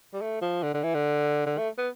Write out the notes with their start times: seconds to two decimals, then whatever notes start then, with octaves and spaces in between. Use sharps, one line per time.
0.14 G3
0.22 A3
0.42 F3
0.63 D3
0.74 D3
0.83 E3
0.94 D3
1.46 D3
1.58 A3
1.78 B3